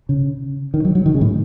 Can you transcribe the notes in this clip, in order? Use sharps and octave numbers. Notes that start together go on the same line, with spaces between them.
C#3
D#3
F#3
F#3
D#3
C#3
A2